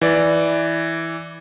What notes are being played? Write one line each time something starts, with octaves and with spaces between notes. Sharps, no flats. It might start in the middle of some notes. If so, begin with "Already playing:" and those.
E3 D5